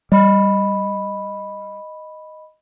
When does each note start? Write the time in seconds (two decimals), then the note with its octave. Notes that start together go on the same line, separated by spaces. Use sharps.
0.12 G3 D#5 B5